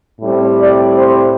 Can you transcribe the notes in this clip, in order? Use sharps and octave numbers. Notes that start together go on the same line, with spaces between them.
A2 G3 C4
D5
C5